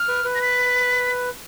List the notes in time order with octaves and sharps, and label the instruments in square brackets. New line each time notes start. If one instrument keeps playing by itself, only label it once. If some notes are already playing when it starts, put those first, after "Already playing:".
Already playing: [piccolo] F6
[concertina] B4
B4
[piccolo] A#6
B6